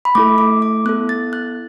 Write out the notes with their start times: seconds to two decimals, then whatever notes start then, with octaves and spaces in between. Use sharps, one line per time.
0.05 B5
0.15 A3 E4 A4 D6
0.38 D6
0.62 D6
0.85 B3 E4 A4 F#6
1.09 A6
1.33 F#6